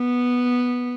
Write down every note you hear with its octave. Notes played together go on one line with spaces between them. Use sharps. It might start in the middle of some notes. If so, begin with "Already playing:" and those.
Already playing: B3